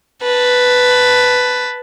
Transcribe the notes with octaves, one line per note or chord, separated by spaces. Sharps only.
B4 A5